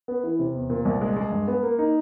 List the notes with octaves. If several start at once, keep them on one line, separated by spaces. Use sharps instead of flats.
B3
E3
C3
E2
A#2
C2
G#3
G#3
G2
B3
A#3
D#4